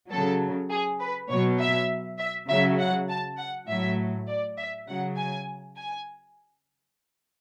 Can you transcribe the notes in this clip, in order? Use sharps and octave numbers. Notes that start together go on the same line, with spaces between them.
C#3 F#3 A4
G#4
B4
B2 F#3 C#5
E5
E5
C#3 F#3 E5
F#5
A5
F#5
A2 F#3 E5
D5
E5
C#3 F#3 F#5
G#5
G#5